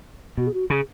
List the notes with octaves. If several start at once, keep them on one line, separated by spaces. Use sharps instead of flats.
B2 F#4
G#4
F#4
C#3 G#4